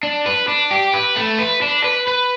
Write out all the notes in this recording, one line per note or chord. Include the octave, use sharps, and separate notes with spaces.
D4
B4
D4
G4
B4
A3
B4
D4
B4
B4